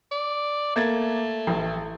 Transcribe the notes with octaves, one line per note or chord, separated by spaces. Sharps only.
D5
A3 A#3 G#6 A6
A1